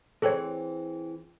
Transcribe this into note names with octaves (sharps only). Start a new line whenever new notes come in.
E3 C4 G#4 A4 C5 C#5 G5